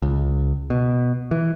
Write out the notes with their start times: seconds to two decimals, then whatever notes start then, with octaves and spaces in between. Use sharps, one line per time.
0.02 C#2
0.70 B2
1.31 E3